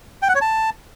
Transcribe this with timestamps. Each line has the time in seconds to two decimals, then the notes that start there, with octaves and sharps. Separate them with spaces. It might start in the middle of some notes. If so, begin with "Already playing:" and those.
0.22 G5
0.29 F#5
0.35 C#5
0.41 A5